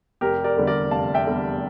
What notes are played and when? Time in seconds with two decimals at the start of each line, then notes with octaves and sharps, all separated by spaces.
0.21 F1 G4 A#4
0.44 A#4 D5
0.56 E2 D3 G3
0.67 A#4 D5
0.91 F1 F5 A5
1.14 E5 G5
1.26 E2 D3 G3